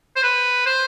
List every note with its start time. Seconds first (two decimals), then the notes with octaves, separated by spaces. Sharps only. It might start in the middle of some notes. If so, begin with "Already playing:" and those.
0.16 C5
0.23 B4
0.66 C5